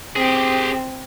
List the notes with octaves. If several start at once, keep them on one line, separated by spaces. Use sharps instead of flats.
C4 G4 G#4